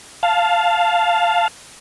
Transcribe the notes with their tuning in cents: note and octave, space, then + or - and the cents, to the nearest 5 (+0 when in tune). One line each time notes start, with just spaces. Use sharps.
F5 +0 A5 +0